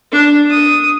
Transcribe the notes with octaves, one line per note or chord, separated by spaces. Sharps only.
D4
D#6